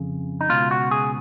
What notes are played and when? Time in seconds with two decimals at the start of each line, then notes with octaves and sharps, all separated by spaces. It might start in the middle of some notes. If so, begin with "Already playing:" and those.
Already playing: F2 C#3
0.41 D#4
0.49 C#2 B2 F4
0.71 F#4
0.91 G#4